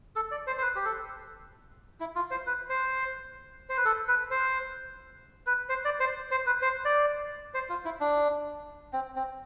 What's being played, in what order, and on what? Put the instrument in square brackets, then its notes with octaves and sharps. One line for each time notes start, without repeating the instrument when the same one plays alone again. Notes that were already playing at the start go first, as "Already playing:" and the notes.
[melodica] A4
D5
C5
C5
B4
G4
A4
E4
F4
C5
B4
C5
C5
B4
A4
B4
C5
B4
C5
D5
C5
C5
B4
C5
D5
C5
F4
E4
D4
C4
C4